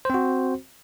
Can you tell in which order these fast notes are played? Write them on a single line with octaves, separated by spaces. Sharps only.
C5 C4 F#4